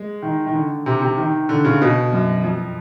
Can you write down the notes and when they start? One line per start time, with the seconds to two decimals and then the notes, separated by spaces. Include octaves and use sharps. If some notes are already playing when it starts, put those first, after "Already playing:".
Already playing: G#3
0.22 D#3
0.46 D#3
0.54 D3
0.86 C3
1.02 C3
1.18 D#3
1.49 D3
1.64 C#3
1.81 B2
2.13 F#2
2.44 F2